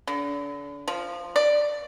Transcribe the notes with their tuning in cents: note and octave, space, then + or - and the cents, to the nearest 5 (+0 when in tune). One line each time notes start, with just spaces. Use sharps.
D3 -35
F3 -5
D5 +5